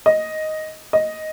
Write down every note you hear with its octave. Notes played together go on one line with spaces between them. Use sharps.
D#5
D#5